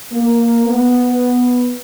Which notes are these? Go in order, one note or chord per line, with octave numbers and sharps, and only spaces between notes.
A#3
B3